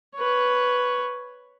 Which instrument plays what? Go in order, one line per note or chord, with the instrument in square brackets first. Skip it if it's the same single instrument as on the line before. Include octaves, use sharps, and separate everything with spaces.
[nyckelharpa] B4 C#5